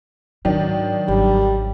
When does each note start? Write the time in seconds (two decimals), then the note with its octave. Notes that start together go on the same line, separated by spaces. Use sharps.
0.45 G#2 D#3 F#3 D4
1.08 G#1 G3